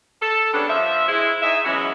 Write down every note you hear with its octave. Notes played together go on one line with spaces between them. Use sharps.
A4
C#3 G3 B3 D4
F3 E5
G#3 E4
G#2 G#4 D#5 E5
B2 E3 F#3 G#3 C#4 F#4